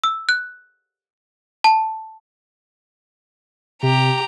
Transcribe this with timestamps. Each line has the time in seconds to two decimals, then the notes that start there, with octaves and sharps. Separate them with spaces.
0.04 E6
0.29 F#6
1.64 A5
3.83 C3 G4 A#5